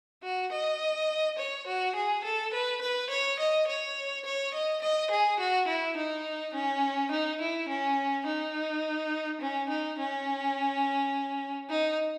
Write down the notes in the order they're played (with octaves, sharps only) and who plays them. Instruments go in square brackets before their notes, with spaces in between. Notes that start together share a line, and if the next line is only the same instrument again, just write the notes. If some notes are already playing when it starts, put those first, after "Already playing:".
[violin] F#4
D#5
C#5
F#4
G#4
A4
B4
B4
C#5
D#5
C#5
C#5
D#5
D#5
G#4
F#4
E4
D#4
C#4
D#4
E4
C#4
D#4
C#4
D#4
C#4
D#4